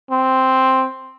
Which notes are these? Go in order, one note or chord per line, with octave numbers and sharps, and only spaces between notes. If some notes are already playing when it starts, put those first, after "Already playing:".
C4